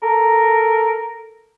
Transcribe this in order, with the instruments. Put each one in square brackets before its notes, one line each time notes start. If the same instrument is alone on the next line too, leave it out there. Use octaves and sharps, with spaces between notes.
[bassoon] A4 [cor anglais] A#4